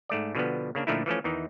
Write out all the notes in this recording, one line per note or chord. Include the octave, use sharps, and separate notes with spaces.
G#2 A3 D5
B2 D3 F3 G3 B3
C#3 A#3 D4
A#2 D3 F3 A3 D#4 E4
E3 F3 A3 C#4
E2 D#3 E3 D#4